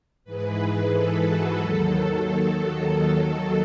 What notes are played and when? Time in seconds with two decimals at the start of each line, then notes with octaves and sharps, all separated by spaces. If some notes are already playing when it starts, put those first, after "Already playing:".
0.25 G#2 E3 G#3 B4
0.90 A4
1.23 F#4
1.56 D#2 D#3 F#3 A4